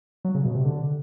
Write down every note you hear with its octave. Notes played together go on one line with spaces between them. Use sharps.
F#3
C#3
B2
C3
D3